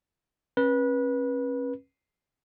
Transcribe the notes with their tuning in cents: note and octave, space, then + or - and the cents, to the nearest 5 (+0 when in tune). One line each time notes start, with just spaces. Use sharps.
C#4 -35 B4 -25